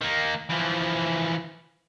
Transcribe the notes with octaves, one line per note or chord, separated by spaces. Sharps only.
D#3 A#3
E3 F3